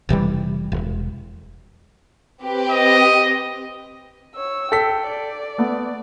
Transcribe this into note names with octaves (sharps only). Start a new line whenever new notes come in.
F1 C3 E3 G3
E1
C4 G4 B4
D#5
C#5 E6
A4 G5 B6
D5
A3 B3